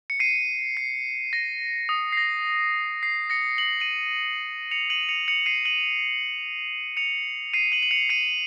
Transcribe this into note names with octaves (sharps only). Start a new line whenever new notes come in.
C#7
C7 D#7
C7
A#6
D#6
C7
A#6
C7
A#6 C#7
F#7
D#7 F#7
C#7 F7
D#7 F#7
C#7 F7
C#7 F7
C7 D#7
D#7 F#7
C#7 F7
C7 D#7
D#7 F#7
F#7
C#7 F7
C7 D#7